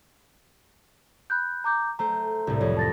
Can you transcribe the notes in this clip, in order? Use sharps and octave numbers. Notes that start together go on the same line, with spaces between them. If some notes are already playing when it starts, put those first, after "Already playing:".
B5 F#6 G6
A#5 D6 G6
A3 C5 A#5
C2 A2
F2 C#5
A5 A6 A#6